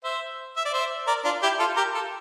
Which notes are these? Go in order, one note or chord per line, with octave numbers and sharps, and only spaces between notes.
C5 E5
E5
D5
C5 E5
A#4 D5
D4 F4
E4 G4
F4 A4
G4 A#4
F4 A4